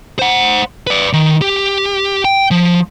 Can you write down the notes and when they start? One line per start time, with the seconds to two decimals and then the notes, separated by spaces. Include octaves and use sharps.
0.19 C5 F#5
0.87 B4 D5
1.13 D#3
1.42 G4
2.25 G5
2.51 F3